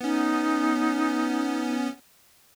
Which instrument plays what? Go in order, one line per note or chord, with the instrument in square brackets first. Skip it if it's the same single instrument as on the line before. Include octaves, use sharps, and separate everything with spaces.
[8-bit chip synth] B3 C#4 [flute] D#4